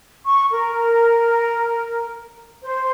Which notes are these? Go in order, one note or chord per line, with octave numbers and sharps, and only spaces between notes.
C#6
A#4
C5